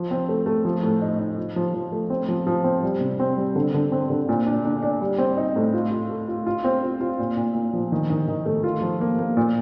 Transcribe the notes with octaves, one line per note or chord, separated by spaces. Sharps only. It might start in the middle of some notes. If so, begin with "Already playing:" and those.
Already playing: F3
C4
A3
A3
F3
A2
D#4
D#4
F3
F3
F3
A3
C4
F3
F3
C4
G3
C3
C4
G3
D3
D3
C4
D3
A#2
D4
D4
D4
G3
C4
D#4
A2
F4
F4
A3
F4
F4
C4
F4
F4
A#2
A#2
A#2
F3
D#3
D#3
D#3
A3
F4
F3
A#3
A#3
A#2